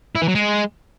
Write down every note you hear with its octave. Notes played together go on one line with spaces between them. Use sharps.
E4
E3
F#3
G#3